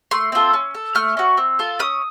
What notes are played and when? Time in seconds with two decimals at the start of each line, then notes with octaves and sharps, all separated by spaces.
0.11 A3 C6
0.32 C4 F4 A4
0.53 C#4
0.75 A4
0.95 A3 F6
1.17 C#4 F#4
1.37 C4
1.59 F4 A4
1.79 C#4 D#6